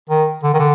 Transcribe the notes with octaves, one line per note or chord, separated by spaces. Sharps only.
D#3
D3
D#3
D3